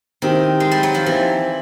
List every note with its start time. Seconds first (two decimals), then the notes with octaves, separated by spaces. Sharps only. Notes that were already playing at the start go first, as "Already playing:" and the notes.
0.22 D#3 C4 E4 G4
0.60 G#3
0.71 G3
0.83 F#3
0.94 F3
1.06 E3 C4 E4 G4